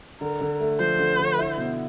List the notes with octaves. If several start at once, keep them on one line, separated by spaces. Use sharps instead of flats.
D3 A#4
D3
A3
F3 C5
D3
D3
E4
B2